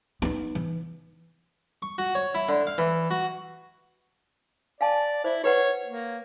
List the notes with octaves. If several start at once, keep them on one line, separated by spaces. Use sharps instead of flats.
B3 D#4
E3
C#6
F#4
C#5
E4
D3
F5
E3
F#4
D5 F5 G#5 A5
E4 C5
G4 B4 C#5 F#5
A#3